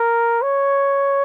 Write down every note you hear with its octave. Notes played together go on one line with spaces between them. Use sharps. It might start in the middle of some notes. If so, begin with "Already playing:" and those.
Already playing: A#4
C#5